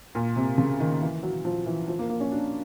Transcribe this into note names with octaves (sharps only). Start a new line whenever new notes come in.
A#2
C3
C#3
D#3
E3
F#3
F3
E3
F3
A#3
A#3
C#4
D4